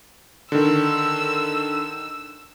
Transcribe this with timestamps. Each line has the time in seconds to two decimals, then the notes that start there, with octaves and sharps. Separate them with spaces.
0.52 D3 D#3 E6